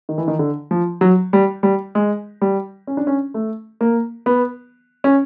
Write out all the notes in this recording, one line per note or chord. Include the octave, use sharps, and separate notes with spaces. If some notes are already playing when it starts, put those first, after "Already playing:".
D#3
E3
D#3
D3
F3
F#3
G3
G3
G#3
G3
C#4
D4
C#4
A3
A#3
B3
C#4